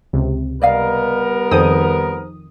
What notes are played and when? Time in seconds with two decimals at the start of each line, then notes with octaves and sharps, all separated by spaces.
0.13 C#2 C3
0.62 G3 B3 A#4 D5 D#5 F5
1.51 F2 D#3 G#4 A4 C5 D#6